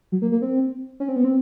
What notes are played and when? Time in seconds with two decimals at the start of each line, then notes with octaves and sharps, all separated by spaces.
0.12 F#3
0.22 A#3
0.32 A#3
0.42 C4
1.00 C#4
1.08 C4
1.16 B3
1.24 C4